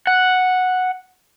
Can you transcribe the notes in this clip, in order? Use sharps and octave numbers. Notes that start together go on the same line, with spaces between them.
F#5